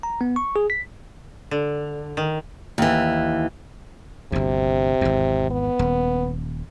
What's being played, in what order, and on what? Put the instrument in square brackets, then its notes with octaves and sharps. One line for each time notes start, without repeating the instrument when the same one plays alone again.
[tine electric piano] A#5
B3
C#6
G#4
B6
[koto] D3
D#3
[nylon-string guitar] D#2 E3
[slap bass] G1 D2 [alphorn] C3
[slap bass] G#1 E2
[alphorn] B3
[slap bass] D#1